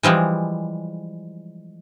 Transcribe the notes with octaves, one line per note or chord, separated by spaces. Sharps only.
E3 F3 G3 G#3